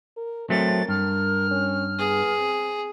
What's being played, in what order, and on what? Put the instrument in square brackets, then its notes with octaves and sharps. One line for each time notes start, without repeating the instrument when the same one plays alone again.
[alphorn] A#4
[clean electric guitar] F#3 A3 C4 [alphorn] A#4 [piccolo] A6
[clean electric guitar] G2 [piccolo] F6
[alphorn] C#4
[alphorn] B3 [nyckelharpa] G#4
[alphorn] C4